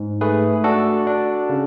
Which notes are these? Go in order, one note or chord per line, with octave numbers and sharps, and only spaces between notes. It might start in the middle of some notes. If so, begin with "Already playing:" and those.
Already playing: G#2
A3 G#4 B4
D4 F#4 A4
D4
C#3